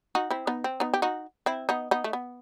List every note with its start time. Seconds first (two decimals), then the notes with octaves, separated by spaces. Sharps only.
0.15 D#4 F#4
0.30 C4 E4
0.47 B3 D#4
0.64 C4
0.80 B3 D#4
0.94 G4
1.02 D#4 F#4
1.46 C4 E4
1.69 B3 D#4
1.91 B3 D#4
2.04 A3
2.13 B3